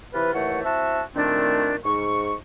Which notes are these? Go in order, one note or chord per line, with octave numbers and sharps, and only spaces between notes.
C3 E3 F4 B4
D#2 E3 A3 C#5 F#5
C4 E4 F#4 E5 A5
A#2 D#3 A3 C4 D4
G#2 C#6